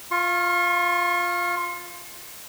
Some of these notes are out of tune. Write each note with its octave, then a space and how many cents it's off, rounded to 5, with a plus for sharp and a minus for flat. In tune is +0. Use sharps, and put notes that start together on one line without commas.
F4 +0 C#6 -45